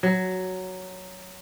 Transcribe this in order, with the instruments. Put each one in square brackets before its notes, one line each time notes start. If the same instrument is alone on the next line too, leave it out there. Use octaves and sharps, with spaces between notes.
[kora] F#3